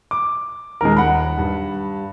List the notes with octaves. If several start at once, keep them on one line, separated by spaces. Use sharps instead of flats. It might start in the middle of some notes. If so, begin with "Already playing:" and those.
D6
D#1 D#2 G#3 A#4
F#5 B5
G2